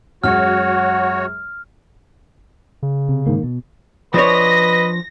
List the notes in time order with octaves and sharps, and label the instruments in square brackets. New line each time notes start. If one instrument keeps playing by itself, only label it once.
[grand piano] F#2 F#3 G#3 [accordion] F#4 C#5 [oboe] F#5 [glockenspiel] F6
[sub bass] C#3
[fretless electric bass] C3
G#2 D#3 A#3
B2
[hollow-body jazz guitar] F3 D4 C#5 [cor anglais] B4 [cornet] D#5 [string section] A#6